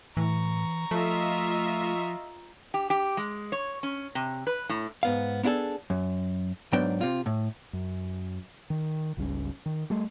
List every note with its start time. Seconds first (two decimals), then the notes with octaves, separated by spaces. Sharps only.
0.17 A2 E3 A#5 C#6
0.91 F3 A3 F4 D#5 E5
2.74 G4
2.90 G4
3.17 G#3
3.52 C#5
3.83 C#4
4.15 C3
4.47 B4
4.69 A2
5.03 G#2 B3 F5
5.43 B3 D4 E4 G#4 A4
5.90 F#2
6.72 G#2 F#3 B3 D4 G5
7.01 C3 F4
7.26 A2
7.73 F#2
8.70 D#3
9.17 G1 C#2 G3 C#4
9.66 D#3
9.90 G3 A3